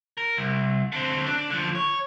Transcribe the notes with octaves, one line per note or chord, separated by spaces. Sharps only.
A#4
C2
D3 C4
D4
D3 F3
C#5